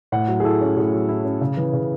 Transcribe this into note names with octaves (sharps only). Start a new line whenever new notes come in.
A2 F#5
F#3
G#4
E4 A4
C#4
A2 G#4
F#3
E4
C#4
C#3
E3
C#3